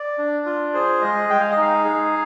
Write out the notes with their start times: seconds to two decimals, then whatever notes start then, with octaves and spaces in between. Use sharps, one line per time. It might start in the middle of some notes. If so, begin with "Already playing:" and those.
Already playing: D5
0.18 D4
0.46 F4
0.73 G#4 C5
1.01 G#3 D#5
1.29 G#3 G5
1.40 F5
1.51 D#5
1.57 D#4 F5
1.85 G#4